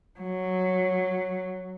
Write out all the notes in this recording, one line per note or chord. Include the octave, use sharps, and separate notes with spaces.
F#3